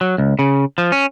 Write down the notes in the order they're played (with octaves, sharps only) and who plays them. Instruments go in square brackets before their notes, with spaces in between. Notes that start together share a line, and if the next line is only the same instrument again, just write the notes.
[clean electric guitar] F#3
C#2
C#3
F3
C#4